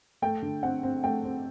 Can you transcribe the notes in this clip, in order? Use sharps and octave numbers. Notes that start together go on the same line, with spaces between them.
A3 G5
D3
C4 F#5
C4
A3 G5
C4